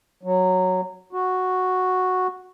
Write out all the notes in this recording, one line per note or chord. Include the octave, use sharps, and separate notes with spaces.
F#3
F#4